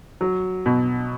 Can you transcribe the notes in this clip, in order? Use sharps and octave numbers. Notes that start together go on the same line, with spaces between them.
F#3
B2